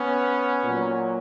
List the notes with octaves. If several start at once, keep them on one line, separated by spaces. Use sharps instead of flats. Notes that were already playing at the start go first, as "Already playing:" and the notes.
Already playing: B3 C#4
A#2 F#3